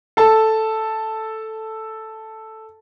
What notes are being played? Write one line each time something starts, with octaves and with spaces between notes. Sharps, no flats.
A4 A5